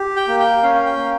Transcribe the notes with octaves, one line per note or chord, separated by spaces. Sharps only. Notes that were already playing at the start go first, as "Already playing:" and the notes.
Already playing: G4
G5
A#3
G5
C#4 F5
F5
G5
A#3